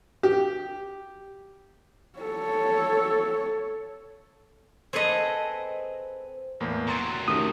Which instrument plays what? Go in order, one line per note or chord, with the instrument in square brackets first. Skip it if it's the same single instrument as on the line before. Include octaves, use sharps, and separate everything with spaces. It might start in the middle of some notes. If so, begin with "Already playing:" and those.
[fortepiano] G4
[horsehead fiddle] A4 C#5
[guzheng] C4 G#4 A4 B4 D#5
[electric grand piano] E2 A2 A#3
[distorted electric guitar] C3 F#3 [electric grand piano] A#5 C6 A6
[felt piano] D#3 C#4 A#4 [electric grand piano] A3 G4 [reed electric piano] D#6